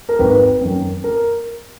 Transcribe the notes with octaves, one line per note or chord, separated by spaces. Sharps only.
A#4
G#1 B4
F#2 D#3
A#4